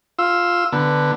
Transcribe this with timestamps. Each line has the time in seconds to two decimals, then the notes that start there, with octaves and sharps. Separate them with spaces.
0.19 F4 E6
0.72 D3 B3